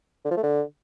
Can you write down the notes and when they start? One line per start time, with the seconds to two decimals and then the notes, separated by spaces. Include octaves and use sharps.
0.25 D3
0.31 F3
0.37 A3
0.43 D3